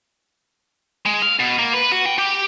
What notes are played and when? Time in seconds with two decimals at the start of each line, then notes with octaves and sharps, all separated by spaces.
1.06 G#3
1.22 F5
1.40 B2
1.59 A#3
1.74 B4
1.92 F#4
2.06 G5
2.18 G4